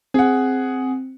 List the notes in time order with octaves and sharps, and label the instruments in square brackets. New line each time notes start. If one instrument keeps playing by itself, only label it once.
[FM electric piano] C4 [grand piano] G#4 F#5